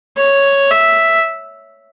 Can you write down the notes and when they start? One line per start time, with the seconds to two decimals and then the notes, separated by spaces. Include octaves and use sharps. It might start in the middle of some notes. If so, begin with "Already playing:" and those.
0.17 C#5
0.71 E5